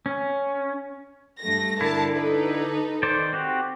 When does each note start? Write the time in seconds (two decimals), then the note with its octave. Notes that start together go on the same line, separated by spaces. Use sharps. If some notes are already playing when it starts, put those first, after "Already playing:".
0.06 C#4
1.41 G2 A3 A#6
1.81 D3 E4 A#4 A5
2.15 D#4 A4 B4
3.03 D#3 C5 D5
3.33 C4 F#4 G4